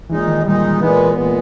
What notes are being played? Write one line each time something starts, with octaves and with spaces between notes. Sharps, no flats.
A#2 E3 G#3 D#4
D#3
A#2 G3 G#3 D#4
A#2 E3 G#3 B3
A#2 G#3 B3